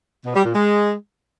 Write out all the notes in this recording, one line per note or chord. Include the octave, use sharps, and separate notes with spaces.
B2
G3
A#2
G#3